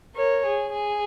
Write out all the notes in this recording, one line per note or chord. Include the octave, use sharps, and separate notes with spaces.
A#4 C#5
G#4
G#4